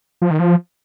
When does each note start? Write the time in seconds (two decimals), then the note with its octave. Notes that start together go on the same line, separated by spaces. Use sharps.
0.22 F3
0.31 D#3
0.39 F3